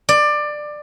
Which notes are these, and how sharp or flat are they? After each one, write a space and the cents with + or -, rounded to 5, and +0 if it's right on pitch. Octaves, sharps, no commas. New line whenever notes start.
D5 +20